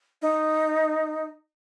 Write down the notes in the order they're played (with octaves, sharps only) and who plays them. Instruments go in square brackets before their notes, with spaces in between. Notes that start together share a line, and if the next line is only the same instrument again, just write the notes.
[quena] D#4